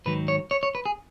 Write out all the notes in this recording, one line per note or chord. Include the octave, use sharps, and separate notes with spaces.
G#2 D#3 F#3 B4
C#5
C#5
C#5
B4
G#4